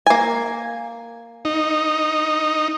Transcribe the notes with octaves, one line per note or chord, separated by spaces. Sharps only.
A#3 G#5
D#4